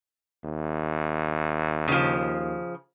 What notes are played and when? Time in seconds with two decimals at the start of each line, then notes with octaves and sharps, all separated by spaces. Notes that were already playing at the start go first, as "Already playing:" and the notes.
0.44 D#2
1.88 C#3 F3